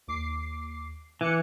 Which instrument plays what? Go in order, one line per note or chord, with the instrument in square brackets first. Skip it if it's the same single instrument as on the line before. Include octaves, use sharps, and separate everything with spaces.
[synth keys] D#2 D6 C7
[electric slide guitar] E3 [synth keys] D6 F#6 C#7